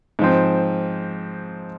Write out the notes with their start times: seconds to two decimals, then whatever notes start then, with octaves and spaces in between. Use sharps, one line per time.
0.19 G#2 F3 C4